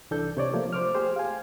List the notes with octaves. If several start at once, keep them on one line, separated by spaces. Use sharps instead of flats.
C2 E3 D4 A4 G6
C3 C#5 D5
F3 A3 A#3
C5 D6 F6
A3 G4 G#4 C5
F5 G#5